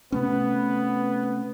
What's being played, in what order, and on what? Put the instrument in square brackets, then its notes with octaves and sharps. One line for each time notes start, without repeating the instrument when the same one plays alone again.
[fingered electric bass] C3 A3 C#4 [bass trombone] B3